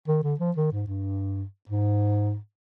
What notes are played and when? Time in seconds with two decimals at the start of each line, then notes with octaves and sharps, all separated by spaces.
0.08 D#3
0.23 D3
0.40 F3
0.56 D#3
0.72 G#2
0.88 G2
1.69 G#2